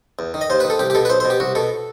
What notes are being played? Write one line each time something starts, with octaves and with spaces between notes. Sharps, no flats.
E2
D#3
D#5
D#2 C5
D#3 B4
A4
C2 G4
G4
B2 A4
B4
B1 C5
C5
B2
G4
C2 F#4
B2 A4